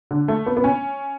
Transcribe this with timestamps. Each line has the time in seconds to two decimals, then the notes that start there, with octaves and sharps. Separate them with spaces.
0.11 D3
0.28 A3
0.46 B3
0.57 B3
0.64 C#4